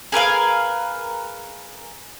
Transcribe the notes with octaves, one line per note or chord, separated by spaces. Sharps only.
G#4 A#4 B4 F5